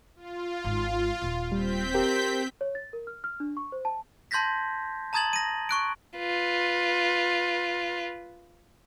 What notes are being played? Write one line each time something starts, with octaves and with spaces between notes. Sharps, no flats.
F4
G#1 G#2
D#1 A#2
G3 C4 G6 B6
G4 A#4
C#5
A6
A#4
F6
F6
D4
C#6
C5
A5
A5 C6 G6 G#6 A#6 B6
A5 A#5 D#6 G#6 A6 F#7
A#6 D#7
C#6 F#6 D7
F4 B4